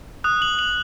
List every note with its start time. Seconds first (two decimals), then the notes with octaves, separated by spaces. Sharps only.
0.24 D#6 F#6
0.42 F#7
0.59 F#7